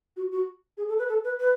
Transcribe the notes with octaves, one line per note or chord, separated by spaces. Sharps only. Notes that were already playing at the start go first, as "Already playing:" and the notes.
F#4
F#4
G#4
A4
B4
A4
B4
B4